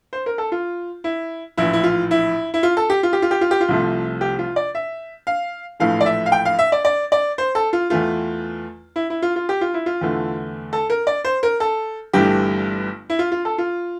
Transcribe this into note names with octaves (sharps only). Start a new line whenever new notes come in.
C5
A#4
A4
F4
E4
A#1 A2 E3 E4
E4
F4
E4
E4
F4
A4
G4
F4
G4
F4
G4
F4
G4
F4
C2 C3 F3 A3
G4
F4
D5
E5
F5
A#1 A2 E3 A3 F5
D5
E5
F5
G5
F5
E5
D5
D5
D5
C5
A4
F4
E2 E3 A3 F4
E4
E4
F4
F4
G4
F4
E4
F4
E2 D3 A3
A4
A#4
D5
C5
A#4
A4
G1 G2 E3 A3 G4
E4
F4
F4
A4
F4